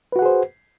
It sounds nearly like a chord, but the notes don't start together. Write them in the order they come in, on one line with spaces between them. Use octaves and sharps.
B4 F#4 F#5 G#4 C5